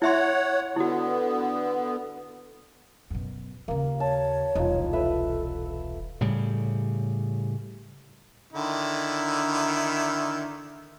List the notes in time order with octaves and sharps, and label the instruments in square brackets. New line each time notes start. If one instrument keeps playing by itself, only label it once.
[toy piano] E4 E5 C6 [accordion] C#5 F#5
[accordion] D3 B3 [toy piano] E4 F#4
[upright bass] F#2 B2
[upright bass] D#2 C#3 [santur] A#3
[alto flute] C#5 [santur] A5
[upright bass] E1 C2 [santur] F3 D#4
[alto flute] A4 [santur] B4 E5
[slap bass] A2 C#3 G3
[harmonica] D3 D#3 E4